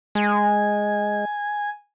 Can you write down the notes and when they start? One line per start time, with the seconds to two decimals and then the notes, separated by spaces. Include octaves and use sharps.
0.15 G#3 G#5